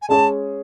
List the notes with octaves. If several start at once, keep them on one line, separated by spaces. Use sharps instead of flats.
G#5
G#3 C#4 G#4 C#5 A5